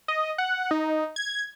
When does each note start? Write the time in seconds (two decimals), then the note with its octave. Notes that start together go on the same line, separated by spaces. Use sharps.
0.08 D#5
0.38 F#5
0.71 D#4
1.16 G#6